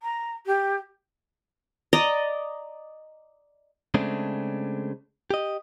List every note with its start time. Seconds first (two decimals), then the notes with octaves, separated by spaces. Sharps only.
0.01 A#5
0.46 G4
1.93 D5 D#5 A#5
3.94 C#3 G#3 A3 C4 D4
5.31 G4 D#5